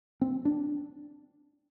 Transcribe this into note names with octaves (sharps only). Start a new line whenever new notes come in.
C4
D4